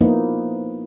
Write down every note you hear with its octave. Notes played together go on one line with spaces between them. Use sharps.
F3 A#3 B3 D#4 E4